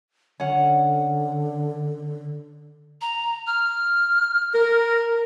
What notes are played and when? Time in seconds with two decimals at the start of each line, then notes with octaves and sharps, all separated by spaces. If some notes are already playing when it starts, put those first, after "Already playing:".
0.40 D3 C#4 F#5
3.01 A#5
3.47 F6
4.55 A#4